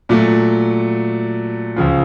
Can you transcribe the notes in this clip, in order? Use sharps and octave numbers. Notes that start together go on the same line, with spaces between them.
A#2 F#3 A3
C#2 C#3 F3